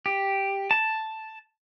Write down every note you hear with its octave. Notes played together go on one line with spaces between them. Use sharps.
G4
A5